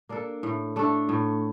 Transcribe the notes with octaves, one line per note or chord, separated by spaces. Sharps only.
A#3 D4 A4
A2
A3 D4 A4
A2